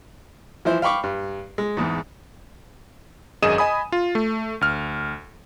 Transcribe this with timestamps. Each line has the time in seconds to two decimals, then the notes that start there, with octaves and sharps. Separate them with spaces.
0.65 E3 F3 E4 C5
0.82 F5 G5 B5 C#6 D6
1.04 G2
1.58 G#3
1.77 E2 G#2
3.42 G#1 F#2 G#4 D#5 D#7 E7
3.58 D#5 G#5 B5 D#6
3.92 F4
4.15 A3
4.61 D2 F6